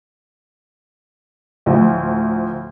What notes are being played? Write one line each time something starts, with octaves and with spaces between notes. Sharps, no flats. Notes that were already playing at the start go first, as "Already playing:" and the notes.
D2 A2 F3